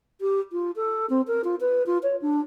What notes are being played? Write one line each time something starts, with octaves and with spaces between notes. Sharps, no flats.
G4
F4
A4
C4
A#4
F4
B4
F4
C#5
D4